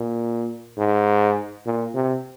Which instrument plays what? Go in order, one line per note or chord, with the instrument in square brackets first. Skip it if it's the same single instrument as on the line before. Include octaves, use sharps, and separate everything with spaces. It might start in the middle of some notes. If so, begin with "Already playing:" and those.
Already playing: [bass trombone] A#2
G#2
A#2
C3